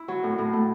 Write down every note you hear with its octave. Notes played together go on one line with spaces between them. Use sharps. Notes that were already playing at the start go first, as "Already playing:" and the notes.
Already playing: E4
F#3
A2
A2
A3